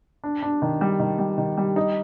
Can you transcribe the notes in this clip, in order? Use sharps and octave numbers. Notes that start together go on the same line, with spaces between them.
D4
D4
D#3
G3
D#3
G3
D#3
G3
D#4